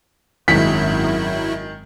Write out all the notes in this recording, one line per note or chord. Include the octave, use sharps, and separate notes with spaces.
G#1 F#2 D#3 F#3 G#3 E4 B6